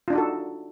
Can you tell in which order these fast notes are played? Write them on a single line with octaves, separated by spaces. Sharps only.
F4 D4 D#4 F#4 A4